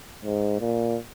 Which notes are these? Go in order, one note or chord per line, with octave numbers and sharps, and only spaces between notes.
G#2
A#2